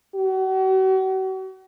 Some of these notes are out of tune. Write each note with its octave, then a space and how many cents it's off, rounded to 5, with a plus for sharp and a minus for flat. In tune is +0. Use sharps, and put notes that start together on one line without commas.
F#4 +40